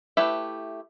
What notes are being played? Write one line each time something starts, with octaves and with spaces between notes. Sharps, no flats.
A3 E4 G4 B4 E5